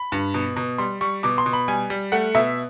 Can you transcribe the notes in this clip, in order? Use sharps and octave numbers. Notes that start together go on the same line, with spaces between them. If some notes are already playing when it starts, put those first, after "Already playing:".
Already playing: B5
G2
B2
B2
G3 C6
G3 C#6
B2 D6
C6
B2
B5
G3 G#5
G3
A3 F#5
B2 E5